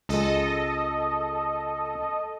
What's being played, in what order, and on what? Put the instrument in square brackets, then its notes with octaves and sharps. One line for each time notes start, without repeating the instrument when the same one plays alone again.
[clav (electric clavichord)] C#2 G#3 [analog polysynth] A4 D#5